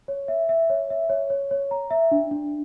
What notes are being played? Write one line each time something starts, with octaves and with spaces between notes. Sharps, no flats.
C#5
E5
E5
C#5
E5
C#5
C#5
C#5
A#5
E5
D4
D4